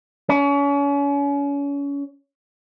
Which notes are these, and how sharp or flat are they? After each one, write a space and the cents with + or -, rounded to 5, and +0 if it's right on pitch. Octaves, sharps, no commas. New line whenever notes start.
C#4 +35